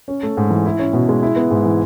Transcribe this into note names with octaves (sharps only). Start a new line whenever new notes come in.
C#4
A3
G#2
E3
E4
C#4
B2
G#3
E4
B3
G#2
E3